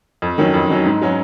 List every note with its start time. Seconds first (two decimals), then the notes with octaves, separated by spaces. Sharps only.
0.22 F2
0.38 D#3 F#3 C#4
0.54 F2
0.69 D#3 F#3 C#4
0.85 G#2
1.01 F#3 C#4 F#4